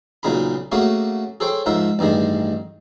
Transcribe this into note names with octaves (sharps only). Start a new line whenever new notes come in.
B1 A#2 C#3 G#4 A#5 B5
A3 A#3 C#4 F#4 G#4
G#4 A4 C5 C#5 G5
G#2 F3 A#4 E5
A1 G2 D#3 G#4